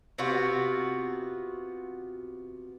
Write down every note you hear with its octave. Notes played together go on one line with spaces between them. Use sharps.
C3 B3 F4 F#4